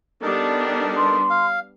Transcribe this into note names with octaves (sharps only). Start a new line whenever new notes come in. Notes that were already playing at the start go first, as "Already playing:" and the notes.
G3 B3 D4 D#4 A4 A#4
C6
F5